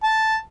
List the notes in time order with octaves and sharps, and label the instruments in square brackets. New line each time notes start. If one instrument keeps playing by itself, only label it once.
[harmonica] A5